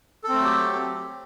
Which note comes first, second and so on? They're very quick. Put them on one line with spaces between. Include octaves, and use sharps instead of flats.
A4 C4 A3 F#3 G4